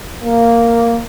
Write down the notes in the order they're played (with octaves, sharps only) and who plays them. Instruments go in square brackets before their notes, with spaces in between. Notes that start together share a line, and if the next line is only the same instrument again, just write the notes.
[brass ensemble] A#3